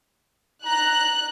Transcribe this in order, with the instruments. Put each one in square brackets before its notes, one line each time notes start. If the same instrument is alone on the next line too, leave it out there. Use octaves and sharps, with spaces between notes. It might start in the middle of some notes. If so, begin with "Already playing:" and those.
[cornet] A#5 [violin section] F#6